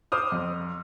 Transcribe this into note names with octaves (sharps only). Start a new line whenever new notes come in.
C5 D6 D#6 F6
F2